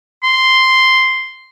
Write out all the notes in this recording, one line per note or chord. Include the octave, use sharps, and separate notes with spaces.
C6